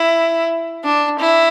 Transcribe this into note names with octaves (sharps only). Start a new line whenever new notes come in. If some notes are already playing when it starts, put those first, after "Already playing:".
Already playing: E4
D4
E4